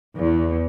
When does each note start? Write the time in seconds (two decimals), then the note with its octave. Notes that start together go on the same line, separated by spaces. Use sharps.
0.18 E2